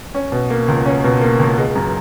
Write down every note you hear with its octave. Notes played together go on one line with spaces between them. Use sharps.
C#4
B2
A#3
C#2
C#4
B2
A#3
C#2
G#3
F#2